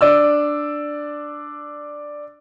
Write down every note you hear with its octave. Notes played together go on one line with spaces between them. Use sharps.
D4 D5 E6